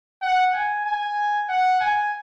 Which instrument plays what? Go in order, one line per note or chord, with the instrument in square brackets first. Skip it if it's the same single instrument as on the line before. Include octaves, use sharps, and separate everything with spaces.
[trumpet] F#5
G#5
G#5
F#5
G#5